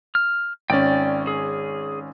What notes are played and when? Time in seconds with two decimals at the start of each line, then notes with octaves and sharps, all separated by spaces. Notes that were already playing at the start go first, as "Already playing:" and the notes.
0.15 F6
0.70 G#1 C#4 D5 G5
1.27 G#4